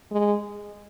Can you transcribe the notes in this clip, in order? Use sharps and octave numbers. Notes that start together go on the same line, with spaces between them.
G#3